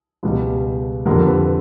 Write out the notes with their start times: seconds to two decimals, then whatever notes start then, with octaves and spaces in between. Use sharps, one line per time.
0.23 C#2 B2 G3
1.06 F2 D3 G3 A#4
1.26 B4